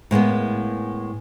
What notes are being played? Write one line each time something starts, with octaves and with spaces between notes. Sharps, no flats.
A2 G#3 A#3 B3